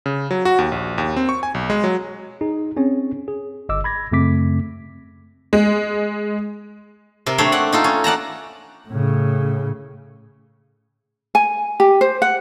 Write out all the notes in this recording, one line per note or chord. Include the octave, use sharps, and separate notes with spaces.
C#3
F#3
F#4
D#2
A#1
D#2
C4
C#6
G#5
B1
G#3
F#3
D#4 G#4
C4 C#4 G#4 C#5
G#4
G1 D#5 D6 E6
B5 G#6 A#6
F#2 C#3 A3 C4 D6 B6
G#3
C3 A#4
A3 C4 D4 C5 C#5
D5 F#5
D#4 F4 A4
C#4
D5 F#5 A5 A#5
A2 C#3
G#5
G4
C5
F#5